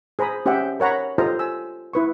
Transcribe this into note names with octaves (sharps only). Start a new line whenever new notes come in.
G#4 C5 A#5 B5 D#6
C#4 G4 C5 E5 F#5 G5
A#4 C#5 F#5 A#5 B5
F4 G4 A4 C5 D#5 A#5
G#5 E6
E4 B4 C#6